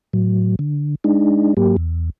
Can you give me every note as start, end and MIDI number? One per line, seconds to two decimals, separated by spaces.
0.13 0.55 45
0.13 0.55 54
0.59 0.95 50
1.04 1.54 56
1.04 1.54 62
1.04 1.54 63
1.57 1.76 44
1.57 1.76 54
1.57 1.76 58
1.57 1.76 67
1.77 2.10 40